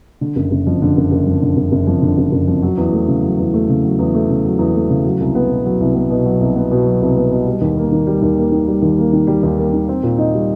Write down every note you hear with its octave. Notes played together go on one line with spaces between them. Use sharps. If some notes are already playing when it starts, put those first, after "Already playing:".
D3
F#1
F#1
F2
D3
F#1
F#1
F2
D3
F#1
F#1
F2
D3
F#1
F#1
F2
F#3
E2
A3
C#3
F#3
E2
A3
C#3
F#3
E2
A3
C#3
F#3
E2
A3
C#3
F#3
C2
B3
B2
F#3
C2
B3
B2
F#3
C2
B3
B2
F#3
C2
B3
B2
G3
D#2
A#3
D#3
G3
D#2
A#3
D#3
G3
D#2
A#3
D#3
G3
D#2
A#3
D#3
C4
A#2
D#4
G3